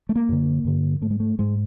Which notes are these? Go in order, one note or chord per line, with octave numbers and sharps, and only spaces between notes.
A3
A#3
F#2 D3
G2 D3
G#2 A3
G#3
A3
G#2 G#3